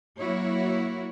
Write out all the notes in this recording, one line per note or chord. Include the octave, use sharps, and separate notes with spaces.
F#3 A#3 E4 F#4 C#5